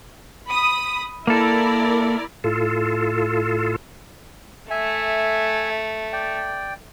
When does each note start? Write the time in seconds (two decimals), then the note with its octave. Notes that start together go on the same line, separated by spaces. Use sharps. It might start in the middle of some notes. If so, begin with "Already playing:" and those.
0.47 B5 D#6
1.27 A#3 E4 A4 A#4 D5
2.44 A2 F4 A4
4.70 A3 E5 G#5
6.13 D5 G5